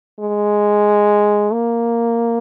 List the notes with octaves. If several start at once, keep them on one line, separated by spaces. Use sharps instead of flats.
G#3
A#3